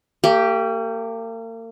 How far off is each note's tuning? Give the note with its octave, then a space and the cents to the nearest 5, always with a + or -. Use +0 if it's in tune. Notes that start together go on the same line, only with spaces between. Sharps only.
A#3 -40 G4 +0